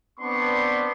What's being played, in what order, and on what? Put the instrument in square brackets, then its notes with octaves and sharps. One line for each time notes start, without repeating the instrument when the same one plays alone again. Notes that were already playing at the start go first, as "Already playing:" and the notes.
[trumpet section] B3 C4 D4 D5 C6 C#6